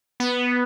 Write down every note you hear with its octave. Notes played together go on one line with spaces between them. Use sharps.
B3